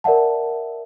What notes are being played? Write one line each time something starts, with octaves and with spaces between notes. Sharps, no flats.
A#4 D5 E5 F#5 A5